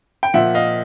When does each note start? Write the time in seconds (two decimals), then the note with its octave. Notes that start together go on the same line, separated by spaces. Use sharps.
0.23 G5
0.34 A#2 F3 E5 F#5
0.54 D#5 F5